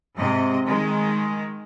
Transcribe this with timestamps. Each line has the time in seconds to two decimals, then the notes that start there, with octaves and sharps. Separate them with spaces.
0.16 G#2 C3 D#5
0.66 D#3 G#3